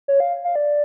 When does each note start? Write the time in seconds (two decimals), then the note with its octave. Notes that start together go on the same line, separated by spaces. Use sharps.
0.08 C#5
0.20 F5
0.45 F5
0.56 D5